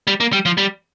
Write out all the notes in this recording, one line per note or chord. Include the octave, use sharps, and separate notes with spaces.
G3
A#3
G3
F3
G3